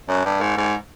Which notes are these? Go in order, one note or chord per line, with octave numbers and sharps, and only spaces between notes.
F#2
G2
G#2
G#2